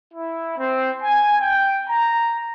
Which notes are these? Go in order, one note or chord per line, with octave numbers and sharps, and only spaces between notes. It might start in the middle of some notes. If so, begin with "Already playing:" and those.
E4
C4
G#5
G5
A#5